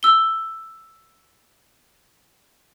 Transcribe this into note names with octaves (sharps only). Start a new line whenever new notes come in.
E6 G7